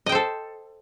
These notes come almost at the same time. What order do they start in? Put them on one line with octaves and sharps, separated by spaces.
D#5 G5 C5 A4